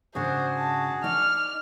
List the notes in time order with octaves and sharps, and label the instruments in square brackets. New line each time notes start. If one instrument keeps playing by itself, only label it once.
[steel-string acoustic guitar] G#2 C#3 D4 [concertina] F#4 G#4 [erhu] C5
[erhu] A5
[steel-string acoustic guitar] D#4 D5 [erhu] F6